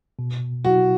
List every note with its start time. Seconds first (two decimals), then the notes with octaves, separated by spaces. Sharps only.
0.19 B2
0.65 F#3 E4 F#4